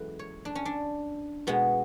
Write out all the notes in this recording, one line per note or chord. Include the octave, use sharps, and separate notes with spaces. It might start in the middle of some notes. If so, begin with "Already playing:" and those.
Already playing: F#2 E3 G#3 A4 B4
C#5
D4
C#4
D4
B2 G#3 B3